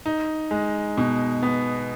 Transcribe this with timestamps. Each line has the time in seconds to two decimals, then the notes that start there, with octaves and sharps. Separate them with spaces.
0.06 D#4
0.51 G#3
0.98 B2
1.43 B3